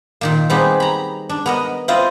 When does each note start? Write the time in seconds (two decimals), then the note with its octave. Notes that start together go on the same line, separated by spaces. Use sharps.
0.21 A#2 D#3 A#3
0.50 G3 B3 C4 D#4 G4 G#4
0.80 A#5 B5
1.29 D4
1.46 B3 A#4 D#5
1.88 C4 E4 F4 D#5 F5